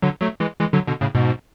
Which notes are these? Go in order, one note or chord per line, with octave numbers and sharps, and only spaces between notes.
D3 F#3
F#3 A3
E3 G#3
E3 G#3
D3 F#3
B2 D3
A2 C#3
G#2 B2